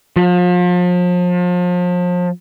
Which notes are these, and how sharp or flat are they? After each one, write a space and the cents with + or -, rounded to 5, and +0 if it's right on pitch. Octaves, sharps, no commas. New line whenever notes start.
F3 +35